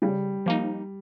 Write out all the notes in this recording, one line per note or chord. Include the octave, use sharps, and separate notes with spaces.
C#3 G3
F3 A#3 D#4